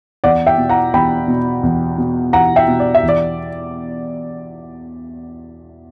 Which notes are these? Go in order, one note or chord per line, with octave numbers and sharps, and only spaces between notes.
E2 D5 F#5
E5 G5
B2
F#5 A#5
E2 G5 B5
B2
E2
B2
E2 F#5 A#5
E5 G5
B2
D5
E5
E2
D5